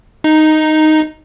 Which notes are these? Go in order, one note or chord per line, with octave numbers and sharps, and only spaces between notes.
D#4